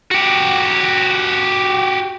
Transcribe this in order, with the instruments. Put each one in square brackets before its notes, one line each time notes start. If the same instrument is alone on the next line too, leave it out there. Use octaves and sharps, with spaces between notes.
[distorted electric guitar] F#4 G4